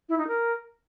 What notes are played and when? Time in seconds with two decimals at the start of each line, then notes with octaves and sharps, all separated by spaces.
0.09 E4
0.18 D#4
0.28 A#4